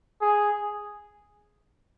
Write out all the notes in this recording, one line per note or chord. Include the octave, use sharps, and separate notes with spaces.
G#4